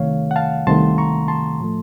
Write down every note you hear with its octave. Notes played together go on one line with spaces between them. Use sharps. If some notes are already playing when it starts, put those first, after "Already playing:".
Already playing: C2 C3 D#3 A3 C#5 F5
F#5
F5 A5
C2 C3 D#3 A3 A5 C6
A#5 C#6
A5 C6
A2 F3 A3